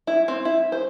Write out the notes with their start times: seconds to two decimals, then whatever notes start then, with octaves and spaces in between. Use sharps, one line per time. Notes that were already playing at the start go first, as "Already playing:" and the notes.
0.07 E4
0.28 C4
0.45 E4
0.72 C5